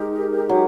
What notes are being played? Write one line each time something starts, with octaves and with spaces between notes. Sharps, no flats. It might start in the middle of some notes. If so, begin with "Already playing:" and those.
Already playing: G#3 D#4 G4 A#4
F#3